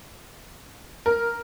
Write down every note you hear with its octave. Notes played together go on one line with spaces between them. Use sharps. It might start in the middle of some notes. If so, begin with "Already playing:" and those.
A#4